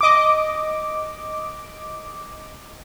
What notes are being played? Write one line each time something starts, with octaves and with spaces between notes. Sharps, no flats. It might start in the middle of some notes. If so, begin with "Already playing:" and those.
D#5 D6